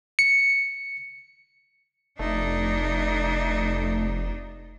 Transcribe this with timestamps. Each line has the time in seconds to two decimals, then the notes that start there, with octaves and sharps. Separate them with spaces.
0.19 C#7
2.19 F1 A3 D4 D#4